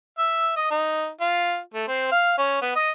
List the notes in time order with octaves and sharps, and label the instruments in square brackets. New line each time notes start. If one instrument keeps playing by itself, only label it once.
[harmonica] E5
D#5
D#4
F4
A3
C4
F5
C#4
B3
D#5